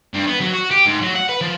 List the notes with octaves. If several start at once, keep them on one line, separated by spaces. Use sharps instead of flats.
G2
B3
F#3
F#4
G4
G#2
F#3
F#5
B4
F3